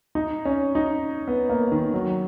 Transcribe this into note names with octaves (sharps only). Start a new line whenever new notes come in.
D#4
C#4
D#4
B3
A#3
D#3
F#3